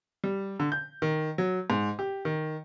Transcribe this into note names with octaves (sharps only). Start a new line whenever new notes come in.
G3
D3
G6
D#3
F#3
G#2
G4
D#3